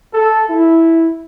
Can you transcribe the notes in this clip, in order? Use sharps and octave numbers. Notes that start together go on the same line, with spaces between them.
A4
E4